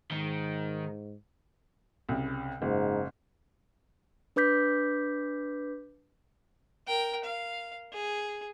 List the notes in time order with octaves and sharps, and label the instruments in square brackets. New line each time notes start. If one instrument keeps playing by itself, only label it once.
[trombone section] G#2 [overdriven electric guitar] D#3
[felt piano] C2 C#3
[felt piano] F#1 [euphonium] G#2
[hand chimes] D4 B4 D6 G6 B6
[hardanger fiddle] A#4 G5
F5
G#4